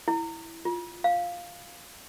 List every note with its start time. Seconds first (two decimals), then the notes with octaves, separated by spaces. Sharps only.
0.08 E4
0.65 F4
1.04 F5